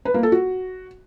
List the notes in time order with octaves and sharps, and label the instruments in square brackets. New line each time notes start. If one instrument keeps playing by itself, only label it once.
[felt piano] B4
A#3
A4
F#4